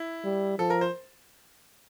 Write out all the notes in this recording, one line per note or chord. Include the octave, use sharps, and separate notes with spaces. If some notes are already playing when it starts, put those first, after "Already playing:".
Already playing: E4
G3
F3 A4
A#4
C5